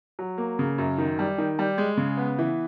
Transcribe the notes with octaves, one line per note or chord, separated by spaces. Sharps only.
F#3
A#3
C#3
F#2
D#3
G3
D#3
G3
G#3
C#3
B3
E3